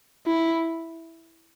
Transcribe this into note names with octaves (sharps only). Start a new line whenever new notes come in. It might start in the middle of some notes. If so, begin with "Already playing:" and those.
E4